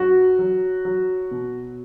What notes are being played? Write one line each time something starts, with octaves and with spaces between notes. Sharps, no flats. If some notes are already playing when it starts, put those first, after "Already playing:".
Already playing: F#2 F#3 F#4
F#3
F#3
B2